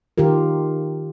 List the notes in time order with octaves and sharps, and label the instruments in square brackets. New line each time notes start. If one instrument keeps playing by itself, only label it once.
[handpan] D#3 F4 G4 A#4